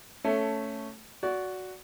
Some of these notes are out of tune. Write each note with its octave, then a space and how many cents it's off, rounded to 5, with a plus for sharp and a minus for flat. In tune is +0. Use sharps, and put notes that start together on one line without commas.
A3 +5 C#4 +0 A4 +0
F#4 +0 D5 -25